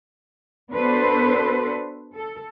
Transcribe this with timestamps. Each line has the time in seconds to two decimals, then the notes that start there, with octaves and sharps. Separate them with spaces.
0.72 B3 D4 F#4 A4 B4 C5
2.17 A4